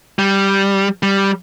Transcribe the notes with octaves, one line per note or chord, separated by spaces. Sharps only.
G3
G3